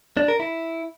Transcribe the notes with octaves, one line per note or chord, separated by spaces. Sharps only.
D4
A#4
E4